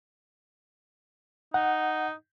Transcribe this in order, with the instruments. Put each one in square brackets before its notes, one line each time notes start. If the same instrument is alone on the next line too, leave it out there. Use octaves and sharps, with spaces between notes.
[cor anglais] D#4 [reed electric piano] F#5